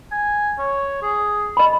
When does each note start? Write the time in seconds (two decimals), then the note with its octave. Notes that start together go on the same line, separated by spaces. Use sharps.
0.11 G#5
0.58 C#5
1.02 G#4
1.57 D#5 B5